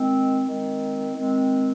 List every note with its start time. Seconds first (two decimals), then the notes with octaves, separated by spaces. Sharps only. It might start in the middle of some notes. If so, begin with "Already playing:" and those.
Already playing: D#3 G#3 C4
0.46 D#3 G#3 C4
1.14 D#3 G#3 C4